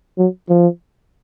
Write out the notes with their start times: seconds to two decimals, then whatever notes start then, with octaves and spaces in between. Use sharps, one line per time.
0.18 F#3
0.49 F3